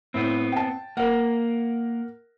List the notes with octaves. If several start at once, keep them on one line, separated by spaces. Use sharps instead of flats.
A2 B3 C4
G5 A5
A#3 A#4 F#5